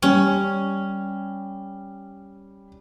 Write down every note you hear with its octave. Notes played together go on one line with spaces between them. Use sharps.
G3 C#4